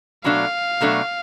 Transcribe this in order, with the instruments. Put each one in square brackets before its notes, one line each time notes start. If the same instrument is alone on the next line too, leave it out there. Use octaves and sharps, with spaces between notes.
[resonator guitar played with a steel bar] B2 F#3 A3 D4 [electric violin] F5
[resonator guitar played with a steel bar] B2 F#3 A3 D4